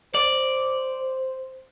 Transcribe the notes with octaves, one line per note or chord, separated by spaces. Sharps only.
C5 D5